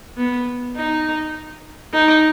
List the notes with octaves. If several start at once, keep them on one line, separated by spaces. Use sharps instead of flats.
B3
D#4
D#4